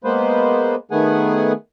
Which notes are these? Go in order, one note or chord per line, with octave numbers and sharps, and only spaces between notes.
G#3 A#3 B3 B4 C5
D#3 A3 B3 G#4 F#5 G#5